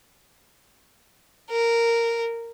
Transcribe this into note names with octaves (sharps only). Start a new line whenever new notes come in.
A#4